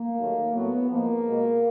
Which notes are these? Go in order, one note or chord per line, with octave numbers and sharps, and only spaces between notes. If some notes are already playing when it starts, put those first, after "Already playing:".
Already playing: A#3
D#2 D#3 F#3 A3
A2 F#3 A3 B3
G#2 F3 G#3 A#3
B2 G#3